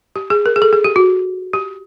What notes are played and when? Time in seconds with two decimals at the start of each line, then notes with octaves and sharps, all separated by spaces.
0.16 G4
0.30 G#4
0.46 A#4
0.56 G#4
0.62 A4
0.73 G#4
0.84 G4
0.96 F#4
1.53 G4